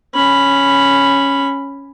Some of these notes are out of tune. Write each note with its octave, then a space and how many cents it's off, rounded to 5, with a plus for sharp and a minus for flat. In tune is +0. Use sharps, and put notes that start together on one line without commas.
C#4 +0 B5 +0